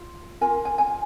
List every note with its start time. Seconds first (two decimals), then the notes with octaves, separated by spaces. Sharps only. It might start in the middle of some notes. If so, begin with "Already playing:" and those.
Already playing: F4
0.41 F4 A#4 G#5
0.65 G#5
0.78 G#5